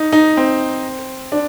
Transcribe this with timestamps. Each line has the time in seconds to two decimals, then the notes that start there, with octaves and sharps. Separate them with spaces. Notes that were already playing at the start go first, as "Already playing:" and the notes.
Already playing: D#4
0.12 D#4
0.37 C4
1.32 D4